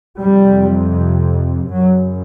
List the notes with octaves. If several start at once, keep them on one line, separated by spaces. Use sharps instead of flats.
F2 C3 G3
F#2 C#3 F#3